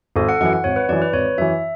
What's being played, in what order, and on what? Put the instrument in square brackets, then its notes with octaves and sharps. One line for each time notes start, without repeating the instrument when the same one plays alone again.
[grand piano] G#1 [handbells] A4
[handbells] F#5
[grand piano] F#2 E3 [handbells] F#5
[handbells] F#5
[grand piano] G#1 [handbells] C#5
[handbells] B4
[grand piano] F#2 E3 [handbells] D5
[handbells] B4
[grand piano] G#1 [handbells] C#5
[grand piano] F#2 E3 [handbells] E5